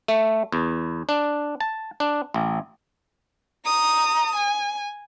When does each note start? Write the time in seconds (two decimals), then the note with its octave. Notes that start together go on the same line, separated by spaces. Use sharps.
0.08 A3
0.52 E2
1.09 D4
1.60 A5
2.00 D4
2.34 A1
3.65 A#5 D#6
4.36 G#5